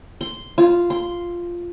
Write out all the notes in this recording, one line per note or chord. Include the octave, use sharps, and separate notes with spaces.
C6
F4
C6